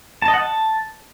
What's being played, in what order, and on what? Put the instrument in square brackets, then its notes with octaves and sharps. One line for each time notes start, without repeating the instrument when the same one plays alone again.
[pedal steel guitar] A5
D#5
F#5
A5